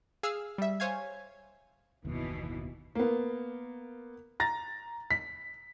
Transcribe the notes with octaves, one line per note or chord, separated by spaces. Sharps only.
G#4 F5 E6 F6
G3 E5
C5 C#5 F5 G#5 G#6
F#1 D#2 B2 E3
A#3 B3
A#5 A6 A#6
B6